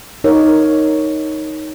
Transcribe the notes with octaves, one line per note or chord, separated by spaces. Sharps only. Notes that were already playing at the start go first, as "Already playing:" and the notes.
D#4 A#4 C#5